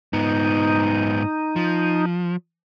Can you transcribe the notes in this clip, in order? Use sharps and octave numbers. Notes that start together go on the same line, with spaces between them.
G#2 B3 D#4
F3